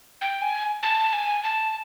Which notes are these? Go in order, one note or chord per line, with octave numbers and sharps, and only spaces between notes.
G5
G#5
A5
G#5
A5